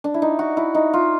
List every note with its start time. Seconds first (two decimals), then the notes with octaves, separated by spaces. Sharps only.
0.04 D4
0.14 E4
0.22 D#4
0.39 F#4
0.57 E4
0.75 D#4
0.93 F4